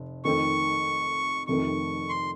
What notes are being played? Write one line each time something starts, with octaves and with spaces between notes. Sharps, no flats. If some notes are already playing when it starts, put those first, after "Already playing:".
Already playing: F1
F2 D#3 A3 C4 D#4 C#6
F1 F2 C3 D#3 A3 C#6
C6